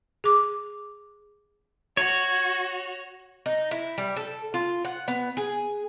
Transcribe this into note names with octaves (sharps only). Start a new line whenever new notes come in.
G#4 D6
F#4 C#5
D#4
E4
G3
A4
F4
F#5
B3
G#4